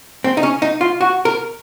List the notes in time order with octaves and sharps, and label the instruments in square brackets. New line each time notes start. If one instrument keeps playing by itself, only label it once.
[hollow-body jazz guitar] C4
D#4
C#4
D#4
F4
F#4
A#4